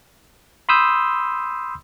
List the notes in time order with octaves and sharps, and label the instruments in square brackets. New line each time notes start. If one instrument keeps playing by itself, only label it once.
[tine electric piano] B5 C6 D#6 E6 G6